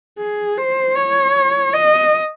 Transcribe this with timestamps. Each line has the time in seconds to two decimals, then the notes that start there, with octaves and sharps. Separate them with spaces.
0.19 G#4
0.58 C5
0.96 C#5
1.74 D#5